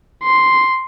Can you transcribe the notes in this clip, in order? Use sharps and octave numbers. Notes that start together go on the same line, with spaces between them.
C6